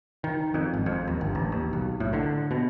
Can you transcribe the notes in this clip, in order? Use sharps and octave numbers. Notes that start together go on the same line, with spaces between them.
D#3
F2
G#1
F2
D#2
G1
A1
D#2
B1
A2
D3
B2